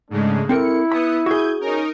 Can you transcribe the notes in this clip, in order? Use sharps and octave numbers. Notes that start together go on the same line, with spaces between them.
G#2 C#3 G#3 A3 D4
C4 E4 A4 A#4 C#7
B3 B5 D#6 C#7
F#4 G#4 D#6 G6 G#6
C#4 D#4 A#4